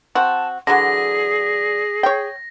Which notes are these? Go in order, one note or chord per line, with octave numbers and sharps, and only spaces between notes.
C4 F#4 A5
D3 E3 F#3 G#4 A#6
C#5 G5